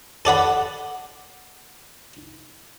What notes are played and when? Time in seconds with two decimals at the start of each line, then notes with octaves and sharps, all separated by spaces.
0.25 A4 D5 F#5 B5